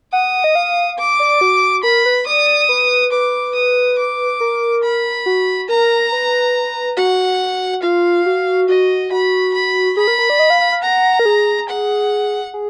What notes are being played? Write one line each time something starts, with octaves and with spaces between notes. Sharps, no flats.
F#5 D#6
D#5
F5
D6
D5
F#4
A#4 B5
B4
D5 D#6
B4
B4 D6
D#6
D6
A#4
B5
F#4
A#4 A#5
B4
F#4 F#5
F4 F5
F#4
F#4 D#5
F#4 B5
B5
G#4 B5
A#4
A#4
D5
D#5
F5
F5
F5
F#5 A#5
A#4
G#4
F#5
G#4